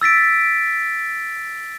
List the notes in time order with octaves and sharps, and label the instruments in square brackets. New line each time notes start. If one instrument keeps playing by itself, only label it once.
[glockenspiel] E6 A6 B6 D7